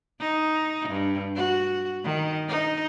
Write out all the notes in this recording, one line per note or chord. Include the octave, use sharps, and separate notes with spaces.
D#4
G2
F#4
D#3
D#4